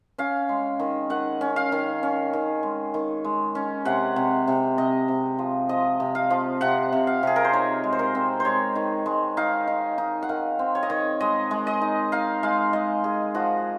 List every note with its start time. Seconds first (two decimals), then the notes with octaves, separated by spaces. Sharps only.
0.18 C#4 F5
0.49 G#3
0.79 D#3
1.10 D#3 F#5
1.41 C#4
1.56 F5
1.72 D#3
2.03 C#4
2.33 D#3
2.63 G#3
2.94 D#3
3.24 G#3
3.55 C#4
3.85 C3 F#5
4.16 C3
4.47 C3
4.78 C3 D#5
5.08 C3
5.39 F3
5.69 F3 D#5
6.00 C3
6.15 F5
6.30 F3
6.61 C3 F#5
6.93 C3
7.07 F5
7.23 C3 G#4
7.36 A#4
7.44 C5
7.53 D#4 C#5
7.84 G#3
7.93 C5
7.99 A#4
8.15 C4
8.40 C5
8.45 G#3 C#5
8.75 D#3
9.06 G#3
9.37 D#4 F5
9.67 D#4
9.98 D#4
10.22 F#5
10.29 D#3 F5
10.59 C4
10.75 C#5
10.83 D#5
10.90 D#3 C#5
11.20 G#3 D#5
11.51 G#3
11.67 D#5
11.81 D#4
12.12 D#4 F5
12.43 G#3 F5
12.73 G#3 D#5
13.04 G#3 G#4
13.34 F3 F#4